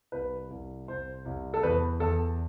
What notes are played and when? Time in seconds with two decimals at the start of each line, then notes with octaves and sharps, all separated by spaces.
0.12 C2 B4
0.50 C2
0.88 C2 C5
1.25 C2
1.54 A4
1.63 E2 B4
2.00 E2 A4